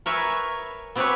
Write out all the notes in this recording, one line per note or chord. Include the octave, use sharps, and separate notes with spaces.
A#4 B4 C#5 E5 G#5
B3 C4 G4 G#4 B4 C#5